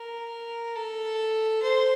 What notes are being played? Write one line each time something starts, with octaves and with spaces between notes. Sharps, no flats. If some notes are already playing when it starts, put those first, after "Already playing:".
Already playing: A#4
A4
C5